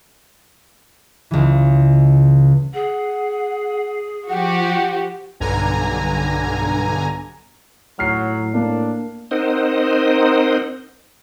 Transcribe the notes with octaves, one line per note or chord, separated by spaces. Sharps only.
C#2 E3
G#4 F#5
F3 F#4 G4 F#5
B1 G2 D3 G#5 A#5
A2 F#3 F6 C7
A#3 D4
C4 D#4 A#4 C5 D#5 F#5